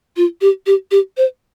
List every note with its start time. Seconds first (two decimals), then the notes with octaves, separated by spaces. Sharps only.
0.17 F4
0.41 G4
0.66 G4
0.91 G4
1.17 C5